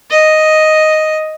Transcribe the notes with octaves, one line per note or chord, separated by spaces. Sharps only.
D#5